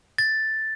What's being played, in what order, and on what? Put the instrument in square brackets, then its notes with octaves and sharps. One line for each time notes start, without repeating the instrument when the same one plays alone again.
[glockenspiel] A6